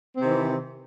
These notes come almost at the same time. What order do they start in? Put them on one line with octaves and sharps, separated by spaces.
C4 C3 D#3 E3